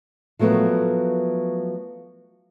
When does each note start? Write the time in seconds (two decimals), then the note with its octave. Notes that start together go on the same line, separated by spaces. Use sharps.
0.39 F3 F#3 A3 B3 A#4